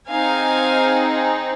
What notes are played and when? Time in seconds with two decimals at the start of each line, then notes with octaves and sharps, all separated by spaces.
0.10 C4 D#4 G#4 F5 G#5